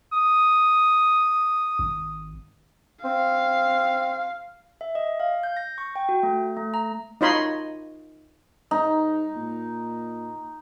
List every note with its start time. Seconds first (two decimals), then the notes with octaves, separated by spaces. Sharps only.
0.13 D#6
1.79 G#1
3.05 C4 F5
4.81 E5
4.95 D#5
5.20 F5
5.43 G6
5.57 A#6
5.78 C#6
5.96 G5
6.09 F#4
6.23 A3
6.57 A3
6.74 A#5
7.21 D#4 F4 C#5 D#5 B5 C6
8.71 G#2 D#4
9.36 A#2